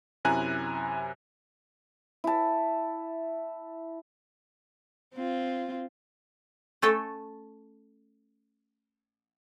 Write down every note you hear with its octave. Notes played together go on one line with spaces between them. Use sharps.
F#2 C3 E4 G#5 A#5 F#6
E4 A5
C4 F4
A3 C#4 A4 G5 A5